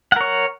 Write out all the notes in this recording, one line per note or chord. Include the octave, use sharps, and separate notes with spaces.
A#4 C#5 F#5